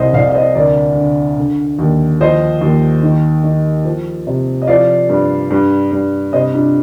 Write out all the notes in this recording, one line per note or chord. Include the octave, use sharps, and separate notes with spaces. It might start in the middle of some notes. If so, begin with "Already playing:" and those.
Already playing: C2 C5 D#5
C2 D5 F5
F5
C5 D#5
D2 A#4 D5
D3
D3
D#2
F3 C5 D#5
D#2
D#3
D#3
F3
C3
D#5
F3 D5 F5
G2
G2
G2
C3 C5 D#5
D4 F4